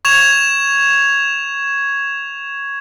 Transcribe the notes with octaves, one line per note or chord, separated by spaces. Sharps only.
C#6 G#6 E7 F7